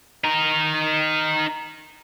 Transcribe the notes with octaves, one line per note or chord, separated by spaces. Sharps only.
D#4 A#4